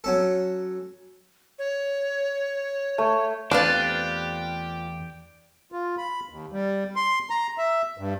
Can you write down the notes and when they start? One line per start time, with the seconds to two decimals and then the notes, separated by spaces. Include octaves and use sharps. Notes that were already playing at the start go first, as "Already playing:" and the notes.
0.04 F#3 C#4 A4
1.59 C#5
2.98 A3
3.51 E2 A3 C4 D4 F4 G4 B4 F5
5.72 F4
5.98 B5
6.29 D#2
6.52 G3
6.96 C6
7.30 A#5
7.58 E5
7.98 G2